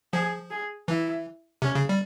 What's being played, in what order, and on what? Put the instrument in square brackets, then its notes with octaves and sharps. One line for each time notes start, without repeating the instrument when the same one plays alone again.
[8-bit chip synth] F3 [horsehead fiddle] G#4
[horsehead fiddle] G#4
[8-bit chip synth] E3 [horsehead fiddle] E4
[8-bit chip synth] C3 [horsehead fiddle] C#4
[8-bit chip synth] C#3
G3